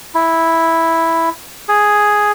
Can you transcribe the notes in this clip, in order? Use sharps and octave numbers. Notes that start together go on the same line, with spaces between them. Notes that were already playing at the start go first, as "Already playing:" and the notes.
E4
G#4